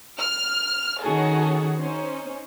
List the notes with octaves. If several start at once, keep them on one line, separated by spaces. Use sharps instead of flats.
F6
D#3 C#4 D#4 F#4 G#4 A4
C#4 D#4 C5